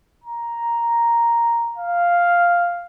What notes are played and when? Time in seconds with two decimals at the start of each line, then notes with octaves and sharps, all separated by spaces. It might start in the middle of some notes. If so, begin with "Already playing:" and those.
0.24 A#5
1.77 F5